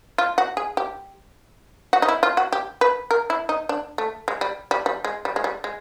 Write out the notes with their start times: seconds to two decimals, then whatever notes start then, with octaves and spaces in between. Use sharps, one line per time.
0.18 F4
0.38 F#4
0.57 G#4
0.77 G4
1.93 F#4
2.02 D#4
2.08 E4
2.23 F4
2.37 F#4
2.52 G4
2.81 B4
3.11 A#4
3.30 E4
3.49 D#4
3.69 D4
3.98 A3
4.28 G#3
4.41 G3
4.71 G3
4.86 G3
5.05 G#3
5.25 G3
5.36 G#3
5.44 G3
5.64 G#3